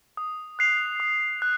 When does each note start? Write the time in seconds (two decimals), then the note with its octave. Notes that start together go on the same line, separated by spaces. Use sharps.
0.17 D#6
0.59 F#6 C7 F7
1.00 D#6
1.42 F#6